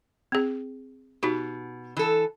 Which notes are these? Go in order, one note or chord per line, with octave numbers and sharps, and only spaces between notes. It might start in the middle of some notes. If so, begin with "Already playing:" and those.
C4 G#4
B2 D#4 F#4 G4
E3 A4